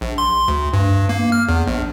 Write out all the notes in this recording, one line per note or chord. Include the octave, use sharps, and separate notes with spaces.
A#1
C6
D2
G2
A#3
F6
E2
A#1